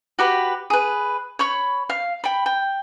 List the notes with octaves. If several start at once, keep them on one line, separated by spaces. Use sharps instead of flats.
F#4 G4 B4
G#4 B4
C#5 B5 C#6
F5
G5 B5
G5